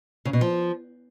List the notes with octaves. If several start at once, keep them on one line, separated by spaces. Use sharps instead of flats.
C#3
B2
F3